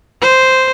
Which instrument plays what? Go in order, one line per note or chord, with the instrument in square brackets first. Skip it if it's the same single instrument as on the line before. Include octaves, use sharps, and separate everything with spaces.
[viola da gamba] C5